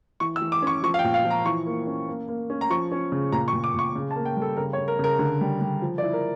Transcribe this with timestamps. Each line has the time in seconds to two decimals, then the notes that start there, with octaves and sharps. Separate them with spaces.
0.20 E3 C#6
0.36 E6
0.42 E3
0.52 D6
0.62 C#4 C#6
0.83 F3 C#6
0.94 F5
0.99 G5
1.04 A#2
1.14 F5
1.25 F3
1.30 A#5
1.45 E3 C#6
1.66 A#3
1.87 C#4
2.08 A#3
2.28 A#3
2.50 C#4
2.61 A#5
2.70 F3 C#6
2.91 C#4
3.12 C#3
3.32 A#2 A#5
3.48 C#6
3.53 A#2
3.64 D6
3.74 A#2 C#6
3.95 C#3
4.11 A5
4.16 A#3
4.25 G5
4.37 G3
4.42 A4
4.57 C#3 A#4
4.73 C#5
4.78 C#3
4.88 A#4
4.99 C#3 A#4
5.19 D3
5.41 G3
5.61 G3
5.82 F3
5.98 D5
6.02 E4
6.13 A#4